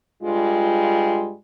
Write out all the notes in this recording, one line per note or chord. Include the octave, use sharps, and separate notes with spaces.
G2 G3 G#3 F4